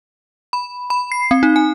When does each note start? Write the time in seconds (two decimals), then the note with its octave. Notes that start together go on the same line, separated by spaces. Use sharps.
0.53 B5
0.90 B5
1.12 C7
1.31 C4
1.43 D#4
1.56 G#5